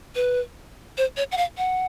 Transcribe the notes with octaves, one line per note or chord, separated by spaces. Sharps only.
B4
C5
C#5
F#5
F5
F#5